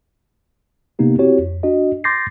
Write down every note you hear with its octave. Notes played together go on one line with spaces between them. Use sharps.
C3 A#3 B3 D#4 G4
C4 E4 F#4 G4 C#5
F2
D4 F#4 D#5
C6 D6 G6 A6 A#6 C7